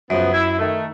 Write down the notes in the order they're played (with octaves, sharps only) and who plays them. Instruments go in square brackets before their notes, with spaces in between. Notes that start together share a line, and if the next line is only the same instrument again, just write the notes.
[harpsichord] F#2 [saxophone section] C#3 F3 B3
[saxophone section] E4
D#3 A3